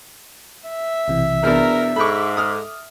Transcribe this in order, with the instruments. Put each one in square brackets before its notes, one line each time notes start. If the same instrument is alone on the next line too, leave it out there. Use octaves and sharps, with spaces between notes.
[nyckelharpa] E5
[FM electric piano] B1 C3 E3
[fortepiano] E2 B2 D4 [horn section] A#4
[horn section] G#2 [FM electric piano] A4 D6 [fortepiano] B5 C#6
[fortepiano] D#6 F6